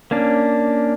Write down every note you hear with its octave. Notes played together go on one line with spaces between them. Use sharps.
A#3 C#4 D4